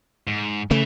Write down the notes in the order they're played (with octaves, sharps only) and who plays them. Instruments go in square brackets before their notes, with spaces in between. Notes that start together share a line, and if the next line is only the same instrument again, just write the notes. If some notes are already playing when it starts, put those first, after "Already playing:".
[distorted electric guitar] G#2
[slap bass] C#3 A3 [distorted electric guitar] E3